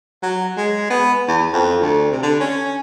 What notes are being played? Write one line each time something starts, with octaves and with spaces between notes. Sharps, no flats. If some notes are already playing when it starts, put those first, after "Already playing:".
F#3
G#3
B3
E2
F2
D2
C3
D3
C#4